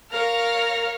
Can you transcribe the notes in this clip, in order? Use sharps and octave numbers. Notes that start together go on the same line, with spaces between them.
A#4 C#5 F5 F6 A#6